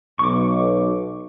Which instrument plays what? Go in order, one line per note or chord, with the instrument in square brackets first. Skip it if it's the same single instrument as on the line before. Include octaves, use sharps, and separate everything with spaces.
[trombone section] B1 [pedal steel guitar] C#6 D6